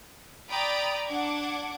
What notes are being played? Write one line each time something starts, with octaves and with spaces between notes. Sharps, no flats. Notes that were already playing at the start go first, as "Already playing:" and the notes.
D5 G5 A#5 B5 D#6 A6
D4 F#5 D6 G#6